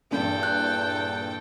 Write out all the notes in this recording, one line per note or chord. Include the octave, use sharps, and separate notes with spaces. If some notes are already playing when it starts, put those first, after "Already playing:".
E2 G2 A#2 E3 A4 G5
F#6